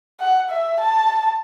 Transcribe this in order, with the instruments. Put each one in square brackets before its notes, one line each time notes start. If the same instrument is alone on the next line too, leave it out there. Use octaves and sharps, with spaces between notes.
[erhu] F#5
E5
A5